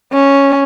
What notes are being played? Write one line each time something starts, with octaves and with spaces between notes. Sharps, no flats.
C#4